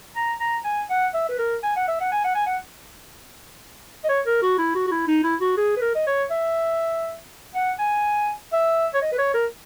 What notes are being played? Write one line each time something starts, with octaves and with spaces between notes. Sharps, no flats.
A#5
A#5
G#5
F#5
E5
B4
A#4
G#5
F#5
E5
F#5
G#5
F#5
G#5
F#5
D#5
C#5
A#4
F#4
E4
F#4
F#4
E4
D#4
E4
F#4
G#4
B4
A#4
D#5
C#5
E5
F#5
G#5
E5
C#5
D#5
B4
C#5
A#4